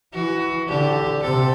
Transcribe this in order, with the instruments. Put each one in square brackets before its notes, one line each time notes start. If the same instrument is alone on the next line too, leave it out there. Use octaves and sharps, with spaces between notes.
[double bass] E3 [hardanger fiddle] F#4
[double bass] D3 [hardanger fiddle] G4
[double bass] C3 [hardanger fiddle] A4